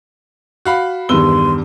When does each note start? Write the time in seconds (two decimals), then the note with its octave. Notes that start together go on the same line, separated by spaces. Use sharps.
0.65 F#4 F5 B5
1.09 E2 G2 D#3 B4 C6 E6 G7